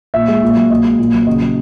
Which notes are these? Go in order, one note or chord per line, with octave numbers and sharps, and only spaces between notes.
A#2 E5
G#3
A#2
F#3
A#2 D#5
G#3
A#2
F#3
C#3 D#5
F#3